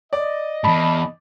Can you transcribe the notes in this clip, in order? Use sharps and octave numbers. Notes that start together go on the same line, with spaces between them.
D5 D#5
E2 G#2 A5 B5